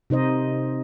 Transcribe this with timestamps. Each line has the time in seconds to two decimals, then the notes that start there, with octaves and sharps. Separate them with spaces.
0.10 C3 D#4 C5 D#5